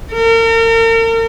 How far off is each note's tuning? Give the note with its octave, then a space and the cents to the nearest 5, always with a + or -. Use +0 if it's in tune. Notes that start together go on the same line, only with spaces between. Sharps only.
A#4 -40